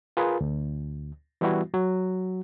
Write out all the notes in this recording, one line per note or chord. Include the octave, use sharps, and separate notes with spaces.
F4 G#4 A#4 B4
D2
E3 G3 B3 E4 F#4
F#3 F#4